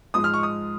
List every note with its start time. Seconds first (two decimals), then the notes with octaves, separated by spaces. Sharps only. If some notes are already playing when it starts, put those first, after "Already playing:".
0.14 G#2 F3 G#3 D#6
0.24 F6
0.34 C#6
0.43 D#6